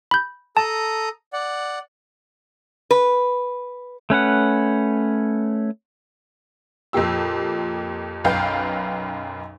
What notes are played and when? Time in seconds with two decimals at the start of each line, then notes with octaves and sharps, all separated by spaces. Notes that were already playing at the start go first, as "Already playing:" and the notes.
0.11 B5 G6
0.57 A4 A5 A#5 D#6
1.33 D5 F#5
2.91 B4
4.10 A3 C#4 B4 F#5
6.93 F2 A#2 A#3 G4 E6
8.24 B1 F#2 B4 F5 G5 G6